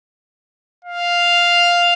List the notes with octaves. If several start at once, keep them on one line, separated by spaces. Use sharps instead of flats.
F5